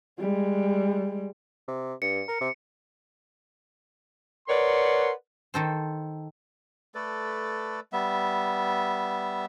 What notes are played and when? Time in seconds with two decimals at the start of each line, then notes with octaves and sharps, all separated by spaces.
0.19 G3 G#3
1.68 C3
2.02 G2 C#7
2.28 A#4
2.41 C3
4.48 A#4 B4 C#5 D5 F#5 C6
5.54 D#3 A4 C5
6.95 A3 A4 B4 D5
7.93 G3 B3 E5